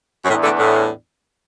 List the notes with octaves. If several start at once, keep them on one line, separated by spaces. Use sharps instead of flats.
F#2
E2 A2 E3 B3 D4
A2 D3
A2